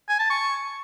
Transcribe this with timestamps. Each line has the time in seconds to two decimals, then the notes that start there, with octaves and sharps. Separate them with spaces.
0.09 G#5
0.19 A5
0.30 C#6